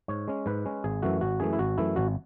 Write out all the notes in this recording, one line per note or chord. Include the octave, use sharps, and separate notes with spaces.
G#2 C#5
G#3 C#4
G#2 B4
G#3 C#4
G#1 G#4
F#2 E3 A3 F#4
G#1 F#4
F#2 E3 A3 G#4
E4
G#1 F#4
F#2 E3 A3 E4
G#1 F#4